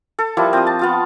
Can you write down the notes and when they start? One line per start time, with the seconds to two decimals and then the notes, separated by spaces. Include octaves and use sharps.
0.19 A4
0.37 F3 G3 A#3 E4
0.53 C4 F4 D#6
0.67 A5
0.79 B3 F4 A5